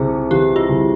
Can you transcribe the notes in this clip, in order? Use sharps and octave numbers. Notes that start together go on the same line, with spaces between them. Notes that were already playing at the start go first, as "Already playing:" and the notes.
Already playing: C2 C3 G#4
E3 G4
F4
C2